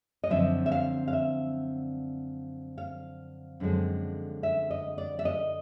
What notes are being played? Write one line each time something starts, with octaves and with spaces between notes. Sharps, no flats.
D#5
F#2 D3 F3 C4 E5
E5
F5
F5
E5
F5
F#2 D3 F3 G#3 C4
E5
D#5
D5
E5
D#5